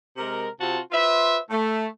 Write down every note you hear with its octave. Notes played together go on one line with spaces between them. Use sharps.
C3 G#3 A#4
C3 C4 F4 F#4 A5
F4 B4 C5 E5
A3